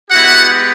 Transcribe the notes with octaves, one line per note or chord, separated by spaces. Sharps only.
G#3 B3 E4 F#4 G4 F#5